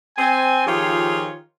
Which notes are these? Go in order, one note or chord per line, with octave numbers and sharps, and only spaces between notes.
C4 G#5
D#3 F3 F4 G4 G#4 C#5